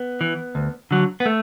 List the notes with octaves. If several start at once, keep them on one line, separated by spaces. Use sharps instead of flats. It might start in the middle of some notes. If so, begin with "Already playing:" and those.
Already playing: B3
E3
D2
D3 F#3
B3
A3